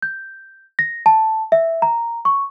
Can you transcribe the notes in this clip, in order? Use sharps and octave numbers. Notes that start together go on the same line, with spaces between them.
G6
A#6
A5
E5
A#5
C#6